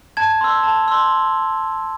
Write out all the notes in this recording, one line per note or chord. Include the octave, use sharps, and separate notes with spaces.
A5 G#6
C6 E6
A5
C6 E6